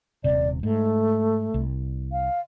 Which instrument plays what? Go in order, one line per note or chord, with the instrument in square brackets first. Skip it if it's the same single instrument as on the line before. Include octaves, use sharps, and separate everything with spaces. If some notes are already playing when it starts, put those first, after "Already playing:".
[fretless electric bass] D#1 C3 [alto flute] D5
[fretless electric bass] G#2 [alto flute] A3
[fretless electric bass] C2
[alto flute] F5